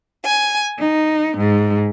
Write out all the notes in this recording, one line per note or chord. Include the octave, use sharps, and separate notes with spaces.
G#5
D#4
G#2